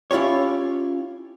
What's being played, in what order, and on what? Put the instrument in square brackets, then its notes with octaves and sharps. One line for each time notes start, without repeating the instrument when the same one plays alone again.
[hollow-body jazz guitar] C#4 E4 F4 G4 C#5